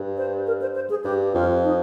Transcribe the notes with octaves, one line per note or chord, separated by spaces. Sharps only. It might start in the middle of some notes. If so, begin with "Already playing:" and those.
Already playing: G2
C5
A#4
C5
C5
G#4
G2 G4
F2 F4
D#4